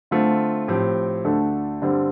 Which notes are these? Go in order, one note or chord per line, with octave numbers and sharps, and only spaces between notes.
D3 A3 C4 F4
A2 F3 C4 G4
D2 D3 A3 D4 A4
G2 D3 G3 C4 G4